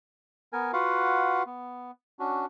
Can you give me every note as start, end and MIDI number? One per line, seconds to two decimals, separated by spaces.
0.53 0.72 59
0.53 0.72 70
0.53 0.72 80
0.73 1.43 65
0.73 1.43 66
0.73 1.43 71
0.73 1.43 77
0.73 1.43 78
1.46 1.91 59
2.19 2.46 61
2.19 2.46 62
2.19 2.46 66